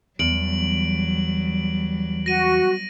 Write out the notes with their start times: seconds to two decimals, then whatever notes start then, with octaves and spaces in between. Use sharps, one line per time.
0.19 E2 F#3 G3 D7 F#7
2.26 F#4 A#6 D#7